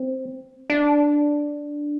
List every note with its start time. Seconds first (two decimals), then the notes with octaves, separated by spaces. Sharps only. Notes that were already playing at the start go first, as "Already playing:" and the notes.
Already playing: C4
0.70 D4